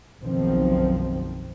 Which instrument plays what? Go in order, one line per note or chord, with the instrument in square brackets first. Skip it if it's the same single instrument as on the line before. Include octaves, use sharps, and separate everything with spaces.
[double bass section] F#1 B1 D#3 F3 C4